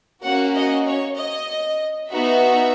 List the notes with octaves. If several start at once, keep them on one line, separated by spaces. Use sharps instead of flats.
A#3 C#4 F#4 F#5
D#5
C#5
D#5
B3 D#4 F#4 E5